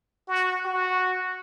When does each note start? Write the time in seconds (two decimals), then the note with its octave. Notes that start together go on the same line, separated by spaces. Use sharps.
0.29 F#4
0.65 F#4